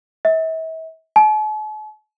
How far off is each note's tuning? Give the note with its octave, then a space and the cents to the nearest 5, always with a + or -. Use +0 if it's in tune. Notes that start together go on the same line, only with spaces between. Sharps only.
E5 -40
A5 -45